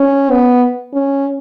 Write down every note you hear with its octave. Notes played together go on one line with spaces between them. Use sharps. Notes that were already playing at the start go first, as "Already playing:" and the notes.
Already playing: C#4
B3
C#4